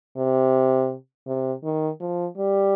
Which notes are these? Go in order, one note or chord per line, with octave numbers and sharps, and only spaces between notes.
C3
C3
D#3
F3
G3